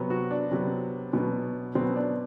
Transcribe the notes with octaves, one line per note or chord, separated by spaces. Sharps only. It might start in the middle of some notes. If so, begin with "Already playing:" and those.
Already playing: C3 F#3 B3
F#4
D4
C3 F#3 B3
B2 F#3 B3
B2 F#3 B3 C4
D4